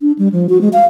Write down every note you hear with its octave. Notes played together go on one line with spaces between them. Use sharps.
D4
G3
F3
F#4
G#3
F5